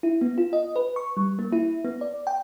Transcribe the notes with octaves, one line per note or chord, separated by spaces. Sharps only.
E4
B3
F4
D#5
B4
C#6
G3
A#3
E4
B3
D5
G5